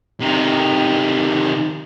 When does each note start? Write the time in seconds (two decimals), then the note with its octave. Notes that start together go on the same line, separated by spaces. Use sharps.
0.20 C3 D#3